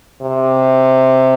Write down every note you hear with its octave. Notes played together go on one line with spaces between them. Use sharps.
C3